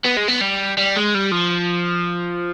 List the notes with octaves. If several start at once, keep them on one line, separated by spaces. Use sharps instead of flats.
B3
G#3
B3
G3
G3
G#3
G3
F3